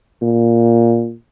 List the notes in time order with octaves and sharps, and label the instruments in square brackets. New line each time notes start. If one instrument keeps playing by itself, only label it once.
[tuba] A#2